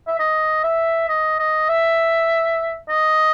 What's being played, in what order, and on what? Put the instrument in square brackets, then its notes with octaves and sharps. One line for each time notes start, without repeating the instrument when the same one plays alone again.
[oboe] E5
D#5
E5
D#5
D#5
E5
D#5